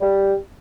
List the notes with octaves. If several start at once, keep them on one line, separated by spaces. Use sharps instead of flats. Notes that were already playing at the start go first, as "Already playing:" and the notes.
G3